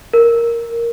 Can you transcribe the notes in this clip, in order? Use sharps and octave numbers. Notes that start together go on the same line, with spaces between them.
A#4